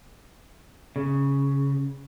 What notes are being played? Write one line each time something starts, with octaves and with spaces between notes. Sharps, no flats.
C#3